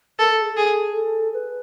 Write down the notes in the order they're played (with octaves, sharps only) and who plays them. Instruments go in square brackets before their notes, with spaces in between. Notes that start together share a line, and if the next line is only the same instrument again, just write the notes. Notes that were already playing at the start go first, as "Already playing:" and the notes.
[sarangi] A4 [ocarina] A#4
[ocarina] A4
G#4
[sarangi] G#4 [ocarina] A4
[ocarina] A4
B4